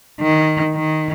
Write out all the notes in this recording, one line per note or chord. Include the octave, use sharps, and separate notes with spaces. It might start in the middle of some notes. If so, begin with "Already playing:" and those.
D#3
D#3